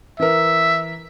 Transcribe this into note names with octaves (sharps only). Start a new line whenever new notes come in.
E3 A#4 E5